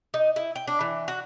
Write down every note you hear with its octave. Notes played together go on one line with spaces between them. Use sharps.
D#4
E4
G5
D4
E3
F#4